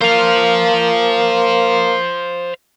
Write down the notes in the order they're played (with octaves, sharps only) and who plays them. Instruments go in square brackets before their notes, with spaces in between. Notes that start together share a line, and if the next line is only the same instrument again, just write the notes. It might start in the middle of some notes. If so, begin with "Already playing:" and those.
[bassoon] A#3 [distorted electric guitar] C5 F5